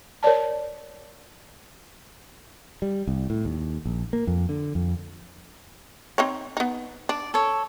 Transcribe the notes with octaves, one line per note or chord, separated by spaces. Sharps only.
A#4 C#5 D5 A5
G3
C2
A2
D#2
A#1
A#3
F2
D3
F2
C4 D#4 C#5
B3 D#4
D4 D5
A4 C#5